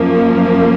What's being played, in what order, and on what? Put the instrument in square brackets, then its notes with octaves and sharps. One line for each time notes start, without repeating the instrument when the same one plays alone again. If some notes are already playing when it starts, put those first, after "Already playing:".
Already playing: [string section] F#2 F3 A#3